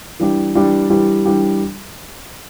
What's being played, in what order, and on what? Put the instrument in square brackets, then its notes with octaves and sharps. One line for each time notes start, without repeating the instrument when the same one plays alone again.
[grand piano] E3 G3 D4 G4
E3 G3 D4 G4
E3 G3 D4 G4
E3 G3 D4 G4